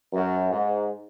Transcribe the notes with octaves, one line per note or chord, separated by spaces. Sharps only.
F#2
G#2